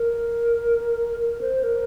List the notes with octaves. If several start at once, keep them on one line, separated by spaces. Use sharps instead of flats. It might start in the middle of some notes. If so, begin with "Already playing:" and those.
Already playing: A#4
A#4
C5
A#4